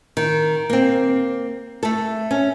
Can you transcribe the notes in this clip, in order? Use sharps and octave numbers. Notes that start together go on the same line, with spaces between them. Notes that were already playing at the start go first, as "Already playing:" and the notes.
D#3
A#3 C4
A3 A4
C#4